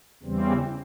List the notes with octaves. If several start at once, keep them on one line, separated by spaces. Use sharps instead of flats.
E2 C#3 E3 G3 C4